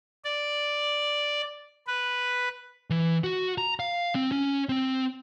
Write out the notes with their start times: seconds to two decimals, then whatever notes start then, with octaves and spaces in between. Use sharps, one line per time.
0.25 D5
1.87 B4
2.90 E3
3.24 F#4
3.58 A#5
3.80 F5
4.15 C4
4.32 C#4
4.69 C4